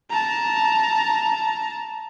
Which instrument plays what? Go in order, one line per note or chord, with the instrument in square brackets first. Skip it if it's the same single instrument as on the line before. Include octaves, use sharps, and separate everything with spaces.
[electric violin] A5 A#5